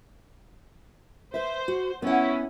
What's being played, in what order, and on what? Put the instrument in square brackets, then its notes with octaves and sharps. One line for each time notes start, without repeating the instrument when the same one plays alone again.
[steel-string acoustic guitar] B4 E5 [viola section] C5
[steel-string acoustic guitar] F#4
[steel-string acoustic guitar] B3 F#5 [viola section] C#4 E4